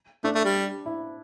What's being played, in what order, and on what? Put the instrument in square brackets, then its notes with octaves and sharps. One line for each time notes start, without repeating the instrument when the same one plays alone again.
[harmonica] A3 [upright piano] D4
[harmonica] A3
G3
[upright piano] E4